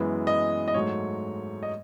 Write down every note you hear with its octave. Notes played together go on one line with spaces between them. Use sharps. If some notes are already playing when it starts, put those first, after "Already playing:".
Already playing: F#2 E3 G#3 B3
D#5
D#5
G#2 F#3 A3 C#5
D#5